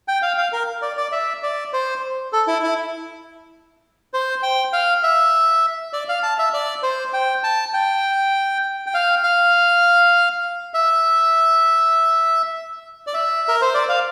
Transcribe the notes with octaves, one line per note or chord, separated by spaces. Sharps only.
G5
F5
F5
A#4
D5
D5
E5
D5
C5
A4
E4
E4
C5
G5
F5
E5
D5
F5
A5
E5
D5
C5
G5
A5
G5
G5
F5
F5
E5
D5
E5
A#4
C5
D5
F5